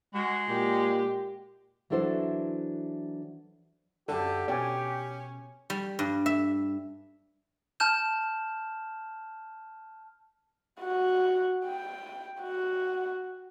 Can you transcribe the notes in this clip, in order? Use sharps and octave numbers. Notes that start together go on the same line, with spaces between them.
G#3 F#4
A#2 G4
E3 F#3 D4 E4 A4 C5
F#2 D3 G4 A4
B2 C#4 D5 G5 G#5
G3
G2
E5
A5 F6 G6 E7
F#4
G5
F#4